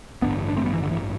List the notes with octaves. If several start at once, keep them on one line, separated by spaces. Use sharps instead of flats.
A1 G2 D3 B3 D4
D4
A3 C4
G3 B3
E3
D3
E3